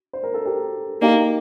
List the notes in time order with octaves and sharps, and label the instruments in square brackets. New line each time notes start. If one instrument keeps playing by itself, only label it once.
[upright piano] C5
A#4
A4
G4 A#4
[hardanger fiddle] A#3 [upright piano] D#4 G4